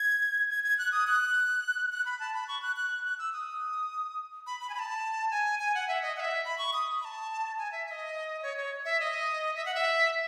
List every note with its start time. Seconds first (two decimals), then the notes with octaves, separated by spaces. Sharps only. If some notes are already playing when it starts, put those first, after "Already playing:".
Already playing: G#6
0.50 G#6
0.64 G#6
0.78 F#6
0.92 D#6
1.07 F#6
1.92 F#6
2.06 B5
2.20 A5
2.34 B5
2.48 C#6
2.62 F#6
2.76 F#6
3.05 F#6
3.19 E6
3.33 D#6
4.47 B5
4.61 B5
4.70 G#5
4.74 B5
4.79 A5
5.31 G#5
5.59 G#5
5.75 F#5
5.89 E5
6.02 D#5
6.16 F#5
6.20 E5
6.45 B5
6.58 C#6
6.73 D#6
7.01 B5
7.05 A5
7.58 G#5
7.72 E5
7.86 E5
7.91 D#5
8.43 C#5
8.57 C#5
8.85 E5
9.00 D#5
9.56 E5
9.65 F#5
9.75 E5